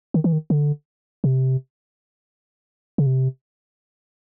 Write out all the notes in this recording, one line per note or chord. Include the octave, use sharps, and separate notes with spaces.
D#3
E3
D#3
D3
C3
C#3
C3